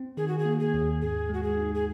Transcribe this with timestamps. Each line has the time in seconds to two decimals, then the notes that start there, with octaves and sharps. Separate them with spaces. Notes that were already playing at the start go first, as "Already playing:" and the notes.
Already playing: C4
0.17 D#3 G#4
0.28 F#4
0.38 G#4
0.45 A#3
0.60 G#4
0.74 D#2
1.01 G#2 G#4
1.29 G#3 F#4
1.43 G#4
1.57 D#4
1.74 G#4